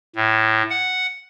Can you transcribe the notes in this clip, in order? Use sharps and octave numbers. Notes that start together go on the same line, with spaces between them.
A2
F#5